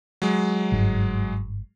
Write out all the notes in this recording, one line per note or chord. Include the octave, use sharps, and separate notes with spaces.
F#3 G#3
G1 G#2